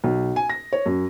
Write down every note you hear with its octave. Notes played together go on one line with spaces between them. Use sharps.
B1
G#5
A#6
C#5
F#2